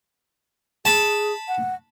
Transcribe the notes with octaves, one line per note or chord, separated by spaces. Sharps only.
G#4 A5 B5
F#5